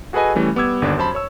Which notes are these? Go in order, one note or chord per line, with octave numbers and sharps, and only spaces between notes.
F#4 G#4 A4 B4 D#5 G#5
E3 G3 A3 C#4
G3 B3 D6 E6 G#6
G1 D#2 D3 D4 A5
F#2 C5 A5 B5
C#5 E6